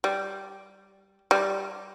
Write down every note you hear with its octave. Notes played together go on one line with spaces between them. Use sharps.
G3
G3